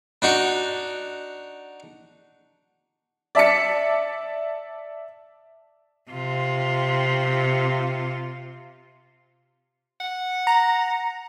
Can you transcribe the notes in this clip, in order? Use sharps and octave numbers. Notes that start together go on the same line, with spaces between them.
D4 D#4 F#4
D5 E5 A5 B6 C#7
C3 F4
F#5
A#5